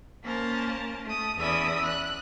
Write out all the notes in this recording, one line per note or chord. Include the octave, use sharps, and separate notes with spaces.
A#3 C#4 A#4 C5 A5
A3 D#6
E2 C#4 D5 E5 B5 D#6
F#6